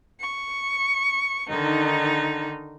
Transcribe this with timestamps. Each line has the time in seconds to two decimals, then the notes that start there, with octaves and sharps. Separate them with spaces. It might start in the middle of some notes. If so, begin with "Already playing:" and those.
0.20 C#6
1.49 D3 D#3 D#4